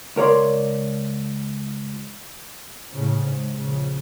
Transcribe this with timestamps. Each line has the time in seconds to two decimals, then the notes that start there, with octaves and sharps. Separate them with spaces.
0.16 C#2 A#4 C#5 D5 C6
2.92 A2 C#3
3.24 G#2
3.58 A#1 C#3